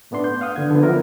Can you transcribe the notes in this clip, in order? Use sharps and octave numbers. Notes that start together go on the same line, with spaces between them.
A2 A3 B3 D4 C6
G6
F5 F#5 D#6
D3 B3 G#6
D3 F3 B3
F3 F#3 D4 E4 F4 A#4